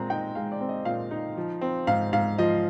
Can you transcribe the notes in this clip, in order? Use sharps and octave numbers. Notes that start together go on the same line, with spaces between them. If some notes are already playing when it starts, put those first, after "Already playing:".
Already playing: A#2 G#3 C4 A#5
D#4 G5
G#3 F5
D5
C4
D#5
A#2 F5
D#4
F3
C4
G#2 F5
G#2 F5
F3 D#5